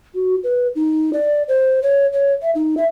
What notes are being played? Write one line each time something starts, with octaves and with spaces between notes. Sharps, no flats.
F#4
B4
D#4
D5
C5
C#5
C#5
E5
D#4
E5